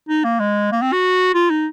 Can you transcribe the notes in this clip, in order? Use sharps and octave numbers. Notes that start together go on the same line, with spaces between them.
D#4
A#3
G#3
A#3
C4
F#4
F4
D#4